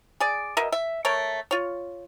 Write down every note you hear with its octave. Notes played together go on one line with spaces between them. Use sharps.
G#4 D5
B2 A#4 D#5 E5
E5
A3 A#4 C#5
F4 C#5